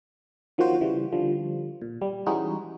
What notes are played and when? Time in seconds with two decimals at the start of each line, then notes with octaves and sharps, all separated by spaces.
0.58 D#3 F3 F#3 A#3 F#4 C5
0.80 C#3 E3 G3
1.12 D3 F3 G3
1.82 A#2
2.01 G3
2.26 E3 G3 G#3 C#4 D#4 F#4